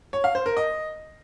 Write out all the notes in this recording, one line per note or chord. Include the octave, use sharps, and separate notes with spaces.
C#5
F5
C5
A#4
D#5